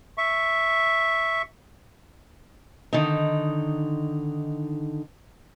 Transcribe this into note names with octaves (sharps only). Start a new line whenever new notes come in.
E5 C#6
D3 D#3 D#4